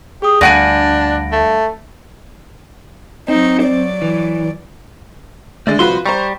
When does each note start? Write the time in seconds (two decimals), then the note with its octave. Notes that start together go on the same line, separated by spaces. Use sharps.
0.22 G4 G#4 D#6
0.41 D2 G2 D4 F#5 G#5 A#6 D7
1.32 A3
3.28 F#3 C4 D#4
3.63 F#3 D5
4.02 E3
5.67 D3 G#3 A3 D5
5.79 C2 F3 F#4 B4 C6
6.06 G3 C5 A#5 C#6